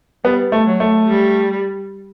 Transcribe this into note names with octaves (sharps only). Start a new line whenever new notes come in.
G3 B3
A3
F#3
A3
G3